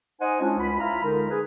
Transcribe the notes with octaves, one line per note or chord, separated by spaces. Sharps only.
D#4 C5 D#5 F#5 G#5
G#3 C#4 D4 E4 F4
C#2 F4 B5
E4 F4 F5 A#5 B5
D3 G#3 D#4 A#4
G#4 B4